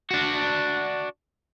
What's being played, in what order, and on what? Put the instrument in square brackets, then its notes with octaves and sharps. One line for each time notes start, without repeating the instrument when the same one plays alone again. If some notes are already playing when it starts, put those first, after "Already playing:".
[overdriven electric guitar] D4 F#4